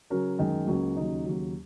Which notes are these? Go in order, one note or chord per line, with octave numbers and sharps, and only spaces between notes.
C#3 F#3 C#4 F#4 A#4
F#2 D#3 G#3 D#4 G#4
C#2 C#3 F#3 A#3 C#4
D#2 C#3 F#3 D#4
D#2 C#3 F#3